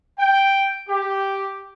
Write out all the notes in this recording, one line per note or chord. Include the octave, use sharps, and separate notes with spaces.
G5
G4